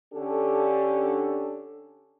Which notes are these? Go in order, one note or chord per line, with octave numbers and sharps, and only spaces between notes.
D3 C#4 D4 G4 A4